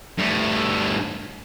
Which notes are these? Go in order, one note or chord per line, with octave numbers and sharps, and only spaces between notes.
G2 A3